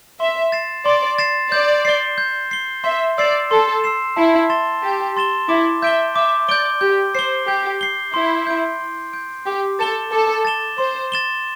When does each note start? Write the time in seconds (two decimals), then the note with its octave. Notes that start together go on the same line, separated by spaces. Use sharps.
0.20 E5 C6
0.52 A6 C7 E7
0.86 D5 C6
1.18 A6 C7 E7
1.52 D5 G6
1.85 C7 G7
2.18 G6
2.51 C7 G7
2.84 E5 C6
3.18 D5 E6 C7 E7
3.51 A4 C6
3.84 E6 C7 E7
4.16 E4 A5
4.50 C6 A6 E7 G7
4.82 G4 A5
5.17 C6 A6 E7 G7
5.48 E4 D6
5.82 E5 G6 D7 G7
6.15 E5 D6
6.49 D5 G6 D7 G7
6.81 G4 G6
7.14 C5 C7 G7
7.47 G4 G6
7.81 C7 G7
8.14 E4 C6
8.47 G6 D7
8.80 C6
9.13 G6 D7
9.46 G4 D6
9.79 A4 A6 E7 G7
10.12 A4 D6
10.45 A6 E7 G7
10.78 C5 C6
11.12 A6 E7 G7